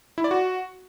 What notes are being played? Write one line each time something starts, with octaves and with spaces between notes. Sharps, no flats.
E4
D5
F#4